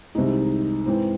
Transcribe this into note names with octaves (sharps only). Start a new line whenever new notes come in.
C2 C3 D#3 G#3 D#4
G#2 E3 C4